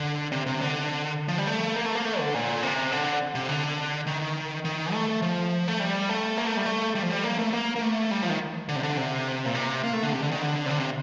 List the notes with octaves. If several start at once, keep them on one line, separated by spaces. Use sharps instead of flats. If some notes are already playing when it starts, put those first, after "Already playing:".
Already playing: D3
C3
C3
D3
F3
G3
A3
A#3
A3
A#3
A3
D3
A#2
C3
D3
C3
D3
D#3
D#3
A3
F3
A3
G3
A3
A#3
A3
G3
A3
G3
F3
G3
A#3
A3
A#3
A#3
A3
G3
F3
D#3
D3
C3
D3
C3
A#2
C3
A#3
A3
D3
C3
D3
D#3
D3
C3
D3
C3